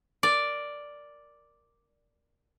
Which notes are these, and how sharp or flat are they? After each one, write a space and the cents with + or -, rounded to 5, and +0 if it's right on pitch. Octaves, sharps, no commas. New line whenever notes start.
A#4 +0 D5 +0